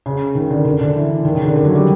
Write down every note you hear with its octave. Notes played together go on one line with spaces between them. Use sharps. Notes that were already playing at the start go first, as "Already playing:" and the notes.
C#3
D#3
D3
D3
D3
E3
D#3
C#3
D3
D3
F#3
G3